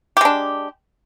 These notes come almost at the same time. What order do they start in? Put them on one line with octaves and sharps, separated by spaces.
G4 G#3 D4